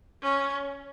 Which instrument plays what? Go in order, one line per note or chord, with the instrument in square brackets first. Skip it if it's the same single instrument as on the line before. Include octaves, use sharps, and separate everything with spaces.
[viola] C#4